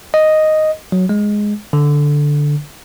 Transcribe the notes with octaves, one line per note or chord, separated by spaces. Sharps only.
D#5
F#3
G#3
D3